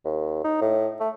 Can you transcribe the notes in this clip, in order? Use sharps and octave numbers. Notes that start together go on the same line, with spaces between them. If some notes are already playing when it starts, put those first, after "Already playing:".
D#2
D#4
A2
A3